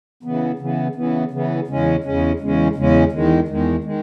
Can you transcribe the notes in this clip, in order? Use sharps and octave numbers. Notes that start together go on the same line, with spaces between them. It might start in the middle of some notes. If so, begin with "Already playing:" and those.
C#3 E3 B3
C#3 E3 B3
C#3 E3 B3
C#3 E3 B3
E2 C#3 G#3 C#4
E2 C#3 G#3 C#4
E2 C#3 G#3 C#4
E2 C#3 G#3 C#4
E2 D#3 G#3
E2 D#3 G#3
D#3 G#3